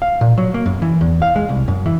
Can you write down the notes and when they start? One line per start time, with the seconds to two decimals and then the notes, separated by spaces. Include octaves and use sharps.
0.02 F5
0.21 A#2
0.38 F#3
0.54 A#3
0.66 F#2
0.82 E3
1.01 E2
1.22 F5
1.36 G#3
1.49 C2
1.68 F#2
1.86 E3